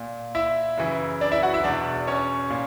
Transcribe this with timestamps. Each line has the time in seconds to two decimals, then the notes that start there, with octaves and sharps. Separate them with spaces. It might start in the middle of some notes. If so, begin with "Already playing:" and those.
Already playing: A#2
0.35 E4 E5
0.78 F#2 C#3 E3
1.21 D4 D5
1.32 E4 E5
1.42 F#4 F#5
1.54 E4 E5
1.64 E2 B2 D4 D5
2.07 C#4 C#5
2.50 A#2